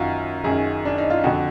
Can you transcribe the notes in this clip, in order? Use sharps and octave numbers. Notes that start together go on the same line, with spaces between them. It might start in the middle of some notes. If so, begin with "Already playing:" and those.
Already playing: F#2 D#3 F4 F#4
F#2 D#3 G#4
D4
D#4
F4
F2 D3 F#4